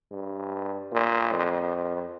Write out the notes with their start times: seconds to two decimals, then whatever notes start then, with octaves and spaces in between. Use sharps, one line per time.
0.12 G2
0.92 A#2
1.32 F2